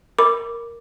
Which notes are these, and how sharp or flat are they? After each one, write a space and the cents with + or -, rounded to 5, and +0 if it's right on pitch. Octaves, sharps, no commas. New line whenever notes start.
A#4 +0 B5 +0 D6 +0